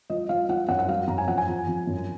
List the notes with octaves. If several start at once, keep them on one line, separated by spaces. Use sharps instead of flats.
F3 D#5
F3 F5
F3 F#5
F#2 F#5
F#5
F#3 F5
F#2 A#5
G#5
F2 F#5
G#5
F2
F2
F#2